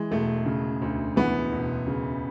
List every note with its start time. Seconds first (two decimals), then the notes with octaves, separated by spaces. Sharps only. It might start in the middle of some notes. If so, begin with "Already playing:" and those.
Already playing: E3 G#3
0.11 E1 A3
0.46 C#3
0.81 D2
1.16 E3 B3
1.52 E1
1.87 C#3